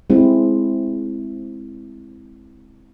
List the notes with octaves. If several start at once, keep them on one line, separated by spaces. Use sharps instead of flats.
G#3 C4 E4